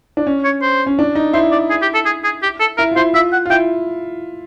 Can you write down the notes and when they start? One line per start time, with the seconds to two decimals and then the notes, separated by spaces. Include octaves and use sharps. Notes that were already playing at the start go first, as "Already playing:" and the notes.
0.17 D4
0.27 C#4
0.45 C#5
0.62 C5
0.87 C#4
0.99 D4
1.15 D#4
1.33 E4 C5
1.52 D5
1.70 G#4
1.82 G4
1.94 A4
2.06 G#4
2.24 G#4
2.43 G4
2.60 A4
2.78 E4 A#4
2.92 F4
2.96 E4 C5
3.14 F4 E5
3.33 F#5
3.46 F4
3.50 E4 G5